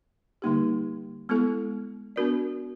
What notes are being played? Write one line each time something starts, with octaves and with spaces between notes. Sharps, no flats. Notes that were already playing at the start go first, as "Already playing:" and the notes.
D3 G3 A#3 D#4 G4
G#3 B3 E4 A4
B3 D4 F#4 A#4 D5